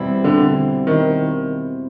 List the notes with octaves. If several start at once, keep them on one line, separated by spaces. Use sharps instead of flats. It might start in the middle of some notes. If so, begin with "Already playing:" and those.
Already playing: E2 B2 G3 C4 E4
D3
D#3